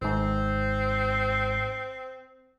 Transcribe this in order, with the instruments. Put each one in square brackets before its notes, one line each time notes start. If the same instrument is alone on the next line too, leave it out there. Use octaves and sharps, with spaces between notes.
[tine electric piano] G#1 G#2 [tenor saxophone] C4